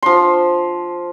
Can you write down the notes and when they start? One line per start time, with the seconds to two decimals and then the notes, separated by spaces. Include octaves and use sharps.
0.03 F3 C6